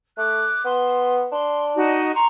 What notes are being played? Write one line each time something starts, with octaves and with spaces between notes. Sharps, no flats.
A3 D6 F#6
B3 C6
D4 C6
D#4 F#4 D#5
A#5 C6 C#6